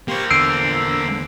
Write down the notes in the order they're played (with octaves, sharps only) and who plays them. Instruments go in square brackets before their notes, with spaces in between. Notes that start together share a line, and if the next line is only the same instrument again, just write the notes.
[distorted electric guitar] A#3 C5 [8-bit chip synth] G4 C6 C#6
[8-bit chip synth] E2 D3 [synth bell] E6 C7 D7